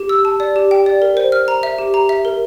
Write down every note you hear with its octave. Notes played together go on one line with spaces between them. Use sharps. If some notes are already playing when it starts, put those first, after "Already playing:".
Already playing: G4
E6
A5
D5
G4
G5
D5
A#4
C5
F6
A#5
E5
G4
A#5
E5
A#4